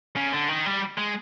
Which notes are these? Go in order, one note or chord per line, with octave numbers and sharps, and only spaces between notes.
C#3
D3
D#3
G3
G#3